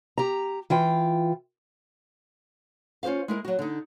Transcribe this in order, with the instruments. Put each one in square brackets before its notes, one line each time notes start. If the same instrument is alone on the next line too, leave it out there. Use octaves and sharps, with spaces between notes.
[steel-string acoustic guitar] G4 A#5
E3 F4 G5
[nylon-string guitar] C#4 F4 G4 C5 F5
G#3 E4 A#4
F#3 F#4
D3 D#4